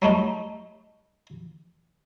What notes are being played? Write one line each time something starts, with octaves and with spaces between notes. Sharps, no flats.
F#3 G3 A3 D#4